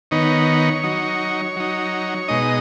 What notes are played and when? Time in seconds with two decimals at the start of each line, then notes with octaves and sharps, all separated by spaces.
0.11 D#3 B3 D#4 C#5
0.83 F#3 D#4
1.56 F#3 D#4
2.28 B2 G#3 D#4 D#5